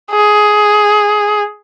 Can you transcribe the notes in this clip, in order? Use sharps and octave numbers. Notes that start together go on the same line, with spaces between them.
G#4